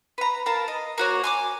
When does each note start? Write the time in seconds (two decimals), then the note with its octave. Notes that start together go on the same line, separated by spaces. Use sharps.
0.18 B4 A#5
0.46 A#4 F5 A5 A#5
0.68 D#5
0.98 A#3 F#4 C#5
1.24 G#5 C#6 D6